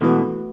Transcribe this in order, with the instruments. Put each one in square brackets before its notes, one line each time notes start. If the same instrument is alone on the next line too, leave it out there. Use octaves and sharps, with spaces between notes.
[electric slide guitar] B2 E3 [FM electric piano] A3 F#4 B4